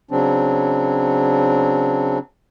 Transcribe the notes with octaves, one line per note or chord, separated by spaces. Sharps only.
C#3 F#3 C4 D4